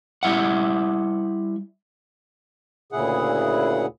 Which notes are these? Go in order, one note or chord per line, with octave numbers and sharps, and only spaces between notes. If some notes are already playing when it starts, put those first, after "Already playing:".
G3 E4 E5 F#5
D2 A#2 C#3 E4 G#4 F#5